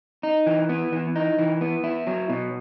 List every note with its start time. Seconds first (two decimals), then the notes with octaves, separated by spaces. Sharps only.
0.23 D#4
0.47 E3
0.69 B3
0.92 E3
1.16 D#4
1.38 E3
1.61 B3
1.84 E4
2.07 F#3
2.30 B2